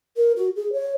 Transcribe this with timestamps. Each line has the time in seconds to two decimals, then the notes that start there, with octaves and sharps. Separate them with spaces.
0.17 A#4
0.36 F#4
0.56 G#4
0.73 C#5